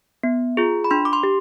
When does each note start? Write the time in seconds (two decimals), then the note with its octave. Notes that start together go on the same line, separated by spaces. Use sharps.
0.23 B3
0.57 F4 G#4
0.84 B5
0.91 D4 C6
1.05 D6
1.13 C6
1.23 G4